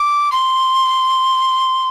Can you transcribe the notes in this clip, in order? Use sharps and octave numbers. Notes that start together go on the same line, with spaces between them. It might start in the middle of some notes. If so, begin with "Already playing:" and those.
Already playing: D6
C6